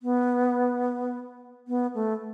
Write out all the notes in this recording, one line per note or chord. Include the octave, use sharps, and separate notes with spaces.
B3
B3
A3